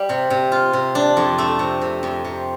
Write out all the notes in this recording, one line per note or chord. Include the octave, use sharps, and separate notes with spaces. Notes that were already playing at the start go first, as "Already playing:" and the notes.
Already playing: G3
C3
C3
F4
C3
D4
F2
A3
C3
C3
F2
C3